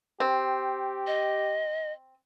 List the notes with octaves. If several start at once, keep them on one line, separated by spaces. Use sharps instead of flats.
C4 G4
D#5